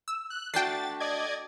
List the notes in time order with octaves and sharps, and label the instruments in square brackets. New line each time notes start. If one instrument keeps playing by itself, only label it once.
[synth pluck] E6
[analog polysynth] F#6
[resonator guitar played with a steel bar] A3 D4 F#4 [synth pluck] G5 C7 [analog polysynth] A6
[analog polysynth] D5 D#5 G#6